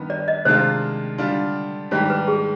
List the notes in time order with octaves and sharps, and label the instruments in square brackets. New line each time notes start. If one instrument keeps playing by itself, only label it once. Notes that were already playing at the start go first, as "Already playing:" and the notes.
Already playing: [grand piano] G2 D#3 B3
[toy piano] D5
D#5
[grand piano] C3 D#3 G#3 D4 F4 [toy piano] C5
[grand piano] D3 G3 D4 F4
[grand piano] G#2 D#3 G3 D4 G4 [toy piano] C5
[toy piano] B4
G#4